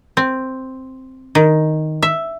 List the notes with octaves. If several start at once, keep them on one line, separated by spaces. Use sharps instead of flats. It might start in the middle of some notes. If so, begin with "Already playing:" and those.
C4
D#3
E5